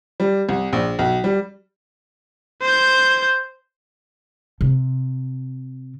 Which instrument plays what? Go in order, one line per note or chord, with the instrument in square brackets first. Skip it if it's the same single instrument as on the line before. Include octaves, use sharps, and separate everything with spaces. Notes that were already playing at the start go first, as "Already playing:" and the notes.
[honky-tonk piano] G3
C2
A#1
B1
G3
[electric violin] C5 G6
[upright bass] C3